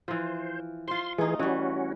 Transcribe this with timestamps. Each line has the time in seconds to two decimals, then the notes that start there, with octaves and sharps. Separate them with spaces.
0.08 E3 F3 C5
0.88 F4 C5 C6
1.18 E3 A3 D#4 G#4
1.39 E3 G3 C#4 F#4